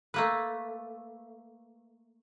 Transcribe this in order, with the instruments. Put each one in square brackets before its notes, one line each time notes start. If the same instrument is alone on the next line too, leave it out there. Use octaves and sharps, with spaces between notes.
[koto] A3 A#3 B4